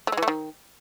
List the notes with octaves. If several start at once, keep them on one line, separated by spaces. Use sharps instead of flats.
A3
G#3
E3
A3
D#3